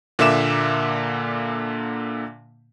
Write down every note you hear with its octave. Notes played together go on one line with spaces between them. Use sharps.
A#2 D3 A#3 E5 D6 E7